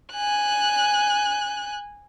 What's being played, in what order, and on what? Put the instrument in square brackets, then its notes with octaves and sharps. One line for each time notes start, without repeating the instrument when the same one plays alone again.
[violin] G#5 F#6